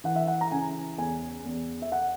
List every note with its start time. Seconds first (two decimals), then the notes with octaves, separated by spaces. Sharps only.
0.04 E3 F#5
0.16 E5
0.27 F#5
0.41 A#5
0.52 C#3 G#5
0.98 E2 G#5
1.45 E2
1.82 E5
1.92 F#5